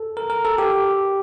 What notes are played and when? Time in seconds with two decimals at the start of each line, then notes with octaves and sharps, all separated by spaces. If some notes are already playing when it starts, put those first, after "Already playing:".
Already playing: A4
0.17 A#4
0.30 A#4
0.45 A4
0.58 G4